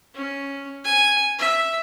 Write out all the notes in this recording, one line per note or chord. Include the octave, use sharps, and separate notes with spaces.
C#4
G#5
E5